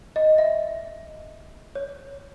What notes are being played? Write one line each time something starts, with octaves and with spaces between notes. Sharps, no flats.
D#5
E5
C#5